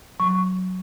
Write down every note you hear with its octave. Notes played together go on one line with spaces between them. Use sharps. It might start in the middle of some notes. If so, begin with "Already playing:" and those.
F#3 C#6